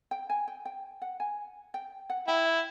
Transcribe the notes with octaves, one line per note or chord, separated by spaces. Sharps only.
G5
G#5
G5
G5
F#5
G#5
G5
F#5
E4 G5